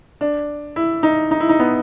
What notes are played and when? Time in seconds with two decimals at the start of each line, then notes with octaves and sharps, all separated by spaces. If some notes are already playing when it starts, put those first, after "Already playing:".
0.21 D4
0.76 E4
1.03 D#4
1.31 D#4
1.40 E4
1.49 D#4
1.60 B3